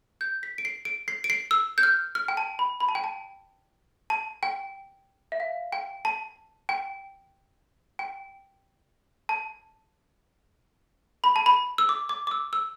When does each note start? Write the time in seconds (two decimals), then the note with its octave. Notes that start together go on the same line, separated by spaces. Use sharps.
0.21 G6
0.43 B6
0.58 D7
0.65 C7
0.85 D7
1.08 C7
1.24 D7
1.30 C7
1.51 E6
1.78 G6
1.83 F6
2.15 F6
2.28 G5
2.37 A5
2.59 B5
2.80 B5
2.89 A5
2.95 G5
3.04 A5
4.10 A5
4.43 G5
5.32 E5
5.40 F5
5.72 G5
6.05 A5
6.69 G5
7.99 G5
9.29 A5
11.24 B5
11.36 A5
11.46 B5
11.78 E6
11.89 D6
12.09 D6
12.27 D6
12.31 E6
12.53 E6